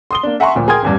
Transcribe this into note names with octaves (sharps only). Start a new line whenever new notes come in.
C6 D#6 G7
A#3 D4
E5 F#5 G#5 A#5 C6 C#6
D2 A#2 F3
G#4 A#4 G5 C6 D#6 G#6
A1 E2 G2